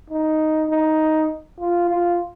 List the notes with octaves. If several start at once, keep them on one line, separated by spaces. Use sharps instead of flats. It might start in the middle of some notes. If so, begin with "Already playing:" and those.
D#4
D#4
F4
F4